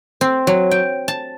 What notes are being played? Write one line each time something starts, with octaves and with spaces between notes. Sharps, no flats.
C4
F#3
G5
A5